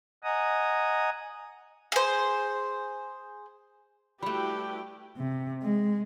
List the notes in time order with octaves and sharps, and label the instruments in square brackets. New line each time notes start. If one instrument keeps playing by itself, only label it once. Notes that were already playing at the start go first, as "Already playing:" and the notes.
[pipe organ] D#5 F#5 G#5 A#5 D#6
[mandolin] G#4 C5
[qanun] G3 A3 [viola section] E4 F#4 B4 [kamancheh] G4 G5 [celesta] B5
[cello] C3
G#3